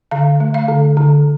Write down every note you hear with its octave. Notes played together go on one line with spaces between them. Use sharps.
D3 F5
A3
F5
D3
D3